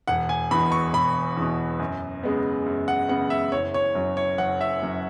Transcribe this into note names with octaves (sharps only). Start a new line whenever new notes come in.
E1 F#5
G#5
E2 B2 B5
C#6
E1 B5
E2 B2
F#2
C#3 G#3 B3
F#2
F#5
C#3 G#3 B3 F#5
E5
F#1 C#5
C#5
F#2 F#3
C#5
F#1 F#5
E5
F#2 F#3